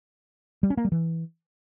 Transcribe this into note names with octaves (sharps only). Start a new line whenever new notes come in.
G3
C#4
A#3
G3
E3